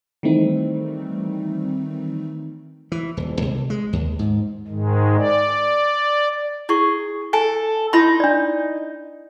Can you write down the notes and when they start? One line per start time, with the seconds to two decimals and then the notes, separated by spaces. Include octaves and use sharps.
0.23 D#3 E3 G3 A3 C4 D#4
2.92 E3
3.17 D#1
3.42 C2
3.70 G#3
3.93 D#2
4.19 G#2
4.68 G#2 D#3 G#3
5.17 D5
6.69 E4 G#4 C#6
7.33 A4 G#5
7.93 D#4 E4 B5 C6
8.20 D4 D5